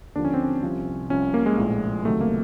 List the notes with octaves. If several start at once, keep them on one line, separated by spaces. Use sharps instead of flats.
D#2 D3 F3 D4
C#4
C4
C#4
C2 C3 F3
C2 C3 F3 C#4
A#3
G#3
A#1 A2 F3
C#2 C3 D#3 F#3 A3
A#3